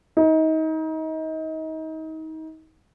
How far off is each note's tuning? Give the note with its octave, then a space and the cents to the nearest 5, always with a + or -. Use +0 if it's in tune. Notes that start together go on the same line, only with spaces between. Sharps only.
D#4 +30